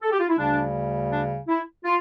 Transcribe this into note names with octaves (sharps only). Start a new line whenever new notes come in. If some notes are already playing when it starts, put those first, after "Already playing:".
A4
G4
F4
E4
D2 C#3 G3 D4
D4
E4
F4